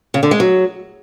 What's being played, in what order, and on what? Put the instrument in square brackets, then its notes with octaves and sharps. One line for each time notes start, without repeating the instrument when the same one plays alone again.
[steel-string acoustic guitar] C#3
D3
G#3
F#3